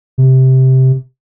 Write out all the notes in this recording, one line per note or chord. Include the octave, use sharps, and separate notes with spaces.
C3